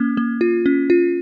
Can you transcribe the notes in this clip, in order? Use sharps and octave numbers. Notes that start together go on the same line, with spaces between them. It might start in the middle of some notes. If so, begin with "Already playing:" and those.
Already playing: A#3 C#4
A#3
F4
C#4
F4